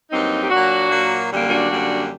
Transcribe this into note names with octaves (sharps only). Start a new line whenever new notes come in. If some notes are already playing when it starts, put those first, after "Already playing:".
G2 F#3 A#3 C4 D#4
G4
A#2 F#3 A#3 D4 F#4
A#2 F#3 A#3
F#2 D3 G3 A#3
D4 F#4
F#2 D3 G3 A#3